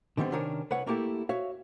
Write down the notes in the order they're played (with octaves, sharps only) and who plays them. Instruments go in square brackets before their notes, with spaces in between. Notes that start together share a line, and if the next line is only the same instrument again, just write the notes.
[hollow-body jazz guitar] D3 D#3 G3 B3 C4
C3 D#3 C#4 D4 A#4
C2 B4 C#5 F#5
A3 A#3 D4 E4 G4 A4
F#4 C#5 E5 F5